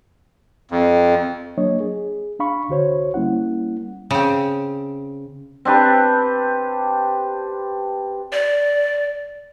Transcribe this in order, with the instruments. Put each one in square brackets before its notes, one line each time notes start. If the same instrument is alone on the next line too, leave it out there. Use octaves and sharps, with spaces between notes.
[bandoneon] F2
[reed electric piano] F#3 A#3 D4 C#5 D#5
G#4
D4 F5 B5 C#6
C2 D3 F#4 C5 C#5
G3 A#3 C#4 E4 F#5
[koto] C#3 C4
[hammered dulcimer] C4 D4 G4 B4
[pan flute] D5